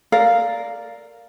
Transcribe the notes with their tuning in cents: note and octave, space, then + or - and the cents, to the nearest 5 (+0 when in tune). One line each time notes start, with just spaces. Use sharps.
A#4 -5 D5 +0 F5 +0